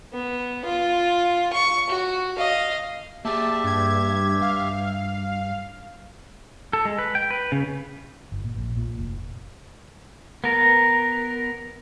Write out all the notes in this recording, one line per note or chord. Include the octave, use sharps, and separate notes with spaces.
B3
F4
C#6
F#4
D#5 F5
A#3 G4 G#4 E5 A5
G2 G#6
G2 F5
A4
G#3
B4
G5
B4
C#3
G1
A#2
A#1
A#2
F1
B3 A#4